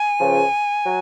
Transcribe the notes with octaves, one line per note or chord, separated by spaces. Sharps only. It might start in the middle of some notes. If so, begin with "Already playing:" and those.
Already playing: G#5
C#2 C#3 F3
F#3